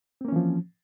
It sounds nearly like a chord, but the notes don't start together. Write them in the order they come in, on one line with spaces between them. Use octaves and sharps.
C4 A#3 C#4 E3 F3